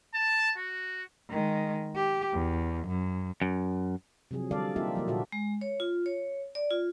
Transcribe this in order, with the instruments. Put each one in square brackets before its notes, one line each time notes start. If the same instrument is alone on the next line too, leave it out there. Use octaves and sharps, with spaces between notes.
[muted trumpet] A5
F#4
[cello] D#3 G#3
G4
E2
F#2
[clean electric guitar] F#2
[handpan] C3 F3 F#3 G#4
D3 G3 A4 D5 F5
A#3 C4 D#4 F4 G4 E5
F3 F#3 A#3
A#2 D3 F#4 A4 E5
[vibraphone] G#3
C#5
F4
C#5
D5
F4